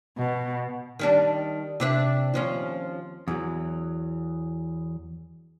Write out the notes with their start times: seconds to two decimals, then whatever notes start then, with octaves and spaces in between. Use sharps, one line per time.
0.17 B2
0.99 D#3 G3 D4
1.80 C3 D4 E5
2.34 D#2 F3 C#4
3.28 E2 E3 F#3